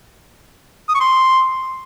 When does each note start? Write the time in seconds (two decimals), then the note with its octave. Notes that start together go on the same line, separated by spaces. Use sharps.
0.89 D#6
0.95 C#6
1.00 C6